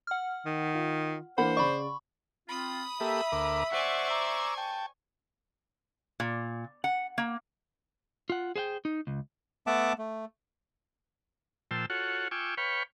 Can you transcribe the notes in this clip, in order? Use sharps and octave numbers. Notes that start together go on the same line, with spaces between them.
F#5 F6
D#3
F4
E3 A#3 D4 C5 F#5 B5
C#3 D5 B5 C#6
C4 F4 B5 D#6
A#3 G4 A4 E5
D2 A#4 D6
C5 D5 F#5 G#5 C#6
A#5 D6 E6
G5 A5
A#2
F#5
A#3
F4 F#5
G#4 C5 F#5 G5
D#4
C#2
A3 B3 E5 F#5 A5 D6
A3
A#2 F3 C5 G5 A5 E6
F4 F#4 A4 C#5 F#5
F4 G5 G#5 C#6 D6 E6
B4 C#5 F5 G5 B5 C#6